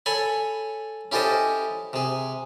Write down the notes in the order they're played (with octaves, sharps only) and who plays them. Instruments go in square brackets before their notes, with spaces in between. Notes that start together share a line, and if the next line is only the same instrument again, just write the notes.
[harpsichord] A4 C#5 G#5 B5
C#4 E4 G4 A4 C5 D#5
C3 G#4